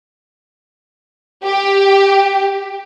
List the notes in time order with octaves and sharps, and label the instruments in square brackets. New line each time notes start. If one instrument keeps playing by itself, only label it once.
[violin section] G4